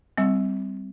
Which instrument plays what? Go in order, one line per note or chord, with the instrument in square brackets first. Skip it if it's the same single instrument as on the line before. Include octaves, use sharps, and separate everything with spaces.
[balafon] G3 C4